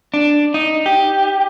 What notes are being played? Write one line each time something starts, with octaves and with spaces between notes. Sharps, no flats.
D4
D#4
G4